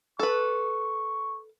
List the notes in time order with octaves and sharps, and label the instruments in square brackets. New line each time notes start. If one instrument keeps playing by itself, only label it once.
[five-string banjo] A4 B4 [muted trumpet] C#6